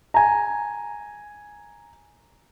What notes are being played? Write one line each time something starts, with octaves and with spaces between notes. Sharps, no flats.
G#5 A#5